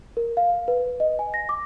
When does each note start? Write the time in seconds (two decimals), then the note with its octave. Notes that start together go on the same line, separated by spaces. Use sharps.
0.17 A#4
0.37 F5
0.68 B4
1.00 D#5
1.19 G#5
1.34 A#6
1.49 D6